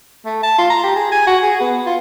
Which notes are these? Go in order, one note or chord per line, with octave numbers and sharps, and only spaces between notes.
A3
A5
F4
A#5
G4
G#4
G#5
F#4
G#4
B3
F4